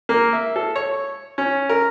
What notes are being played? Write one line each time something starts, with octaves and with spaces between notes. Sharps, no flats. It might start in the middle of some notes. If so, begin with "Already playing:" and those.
A#3
E5
A4
C#5
C#4
A#4